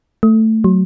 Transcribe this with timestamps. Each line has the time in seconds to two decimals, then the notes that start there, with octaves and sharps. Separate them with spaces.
0.23 A3
0.64 F#3